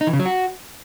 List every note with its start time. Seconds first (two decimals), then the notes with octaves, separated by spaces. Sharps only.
0.01 D#4
0.07 E3
0.13 C#3
0.19 F#3
0.26 F#4